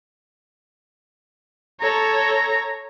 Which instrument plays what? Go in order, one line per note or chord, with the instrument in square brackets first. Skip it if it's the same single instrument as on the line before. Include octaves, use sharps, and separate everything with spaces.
[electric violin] A4 C#5 [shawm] A#5